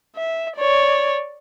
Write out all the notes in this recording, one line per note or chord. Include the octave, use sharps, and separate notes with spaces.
E5
C#5 D5